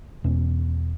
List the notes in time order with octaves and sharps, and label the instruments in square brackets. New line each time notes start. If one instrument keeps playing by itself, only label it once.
[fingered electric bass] E2 B2 C#4